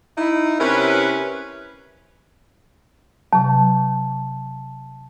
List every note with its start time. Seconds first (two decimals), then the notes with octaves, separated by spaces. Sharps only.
0.18 D#4 E4
0.59 C3 C#4 E4 A#4 B4
3.33 C3 F#3 A5